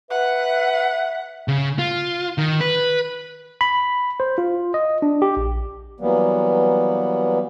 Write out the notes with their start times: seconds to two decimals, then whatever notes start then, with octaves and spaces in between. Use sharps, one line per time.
0.10 B4 E5 F#5
1.48 C#3
1.79 F4
2.38 D#3
2.60 B4
3.61 B5
4.20 C5
4.38 F4
4.74 D#5
5.02 D4
5.22 G4
5.37 A#1
6.00 E3 F#3 G3 A#3 B3